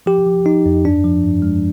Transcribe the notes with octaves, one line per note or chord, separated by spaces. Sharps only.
F3 G4
F3
F3 D#4
F2
G2 D4
F3
G2
G#3